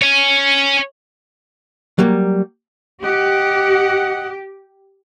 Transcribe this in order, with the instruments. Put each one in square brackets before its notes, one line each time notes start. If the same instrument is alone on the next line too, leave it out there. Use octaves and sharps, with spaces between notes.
[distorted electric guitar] C#5 G#5
[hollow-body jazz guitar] F#3 G3 A#3
[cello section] G4 [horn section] D#5 F#5